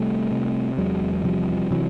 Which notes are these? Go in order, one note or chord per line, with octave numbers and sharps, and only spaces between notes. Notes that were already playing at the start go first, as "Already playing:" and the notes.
Already playing: C3 G3 A3
C3
E2 F#3 G#3
C3 F3 G3
C3 E3 F#3